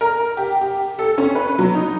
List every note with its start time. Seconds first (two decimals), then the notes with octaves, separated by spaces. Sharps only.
0.01 A#4
0.37 G4
0.61 G4
0.99 A4
1.18 C#4
1.35 B4
1.59 F#3
1.75 D#4